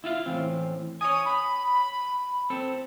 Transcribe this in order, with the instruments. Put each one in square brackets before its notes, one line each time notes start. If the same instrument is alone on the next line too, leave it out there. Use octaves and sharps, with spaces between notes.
[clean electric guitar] E4 F4 F5
A2 E3 C4
[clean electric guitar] C#5 G#5 [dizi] D#6
[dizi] B5
[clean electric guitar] C4 A4